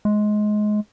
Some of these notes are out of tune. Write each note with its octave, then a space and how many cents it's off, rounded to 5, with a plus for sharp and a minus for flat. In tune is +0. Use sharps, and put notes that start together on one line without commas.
G#3 +20